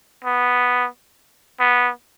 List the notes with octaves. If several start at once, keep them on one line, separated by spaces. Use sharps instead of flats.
B3
B3